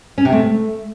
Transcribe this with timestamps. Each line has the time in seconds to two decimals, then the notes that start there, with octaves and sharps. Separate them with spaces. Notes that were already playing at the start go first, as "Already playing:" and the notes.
0.18 C#4
0.25 C3
0.32 A3